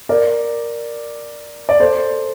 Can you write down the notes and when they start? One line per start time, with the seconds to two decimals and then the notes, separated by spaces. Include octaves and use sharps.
0.09 A#4 D5
1.69 D5
1.80 A4 C5